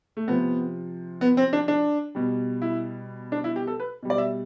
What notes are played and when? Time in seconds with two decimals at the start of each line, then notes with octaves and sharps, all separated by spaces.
0.17 A3
0.28 C3 F3 B3
1.21 B3
1.37 C4
1.53 D4
1.68 D4
2.15 B2 G3
2.62 E4
3.32 D4
3.44 E4
3.56 G4
3.67 A4
3.80 B4
4.03 B2 G3
4.10 D5
4.18 E5